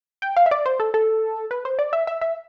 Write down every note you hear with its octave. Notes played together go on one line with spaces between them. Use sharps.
G5
F5
E5
D5
C5
A4
A4
B4
C5
D5
E5
E5
E5